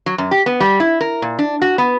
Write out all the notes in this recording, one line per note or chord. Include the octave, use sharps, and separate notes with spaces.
F#3
F#2
G4
B3
G3
E4
A#4
A#2
D4
F#4
B3